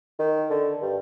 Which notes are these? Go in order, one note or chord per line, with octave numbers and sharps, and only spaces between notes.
D#3
D3
G2